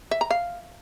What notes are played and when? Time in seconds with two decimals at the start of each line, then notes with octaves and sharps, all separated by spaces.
0.11 E5
0.21 A#5
0.31 F5